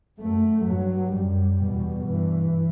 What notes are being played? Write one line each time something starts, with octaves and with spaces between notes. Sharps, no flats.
F#2 A3
G2 F#3
F#2 G3
E2 B2
G2 E3